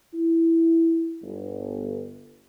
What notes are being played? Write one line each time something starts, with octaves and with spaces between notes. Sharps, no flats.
E4
G1